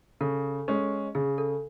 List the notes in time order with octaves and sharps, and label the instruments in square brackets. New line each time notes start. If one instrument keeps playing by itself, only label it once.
[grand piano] C#3 [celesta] A4
[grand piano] G#3 C#4
[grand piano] C#3 [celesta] G#4
[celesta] A4